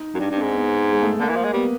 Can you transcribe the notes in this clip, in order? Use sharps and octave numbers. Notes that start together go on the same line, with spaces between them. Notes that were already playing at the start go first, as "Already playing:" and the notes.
Already playing: D#4
F#2
G2 D4
G2
C4
G#2
B3
G#3
A3
D3 A#3
E3
F3
G#3
G3 B3